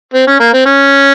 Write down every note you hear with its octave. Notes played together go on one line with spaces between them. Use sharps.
C4
C#4
A#3
C4
C#4